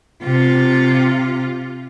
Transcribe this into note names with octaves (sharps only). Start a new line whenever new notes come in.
C3 F4